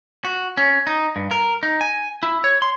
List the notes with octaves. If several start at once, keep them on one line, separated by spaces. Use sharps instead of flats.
F#4
C#4
D#4
G2
A#4
D#4
G#5
E4
C#5
C6